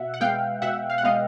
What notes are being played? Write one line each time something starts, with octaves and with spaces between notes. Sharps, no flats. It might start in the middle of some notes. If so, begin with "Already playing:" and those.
Already playing: B2 E5 F#5
F#5
G#3 B3 F5 G5
B2 E5 F#5
F5
F#5
G#3 B3 D#5 F5